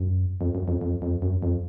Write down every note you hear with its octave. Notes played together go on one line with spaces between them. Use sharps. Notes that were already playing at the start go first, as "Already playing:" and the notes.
Already playing: F#2
F2
F#2
F2
F2
F2
F#2
F2